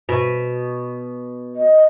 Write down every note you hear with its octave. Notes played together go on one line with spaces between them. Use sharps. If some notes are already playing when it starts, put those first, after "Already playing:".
B2
D#5